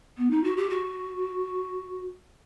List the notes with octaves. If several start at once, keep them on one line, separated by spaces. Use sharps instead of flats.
B3
D#4
F#4
G4
F#4